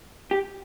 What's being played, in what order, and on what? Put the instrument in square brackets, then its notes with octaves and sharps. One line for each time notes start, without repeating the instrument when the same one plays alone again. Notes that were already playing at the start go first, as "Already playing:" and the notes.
[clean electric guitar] G4